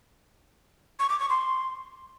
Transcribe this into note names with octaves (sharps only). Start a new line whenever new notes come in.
C#6
D6
C#6
C6